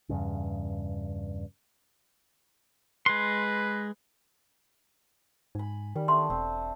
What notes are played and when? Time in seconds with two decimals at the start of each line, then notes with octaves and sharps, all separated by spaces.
0.09 E2 G2 C#3
3.06 G#3 B4 C6
5.55 G#2 G#5 B5
5.96 D#3 G3
6.08 A3 B3 D4 C6
6.30 E1 C4